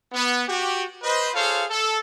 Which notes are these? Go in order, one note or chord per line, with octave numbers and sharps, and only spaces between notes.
B3
F#4 G4
B4 C5 D#5
F4 G#4 A4 C5 C#5 F5
A4